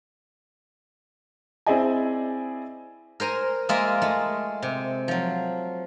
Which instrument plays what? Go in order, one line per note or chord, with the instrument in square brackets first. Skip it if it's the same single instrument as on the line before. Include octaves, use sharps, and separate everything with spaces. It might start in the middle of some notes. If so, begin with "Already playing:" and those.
[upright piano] C4 E4 G#4 D5 D#5 G#5
[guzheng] A#4 C5 G#5 A#5
G#3 A#3 F4 A#4 E5 G#5
G#3 A3
C3
F3 F#3